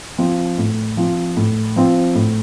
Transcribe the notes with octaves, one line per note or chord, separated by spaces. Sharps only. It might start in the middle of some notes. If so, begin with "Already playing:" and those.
F3 C4 F4
A2
F3 C4 F4
A2
F3 C4 F4
A2